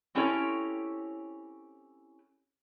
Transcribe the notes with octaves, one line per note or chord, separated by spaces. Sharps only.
C4 C#4 E4 G4 A4 C#5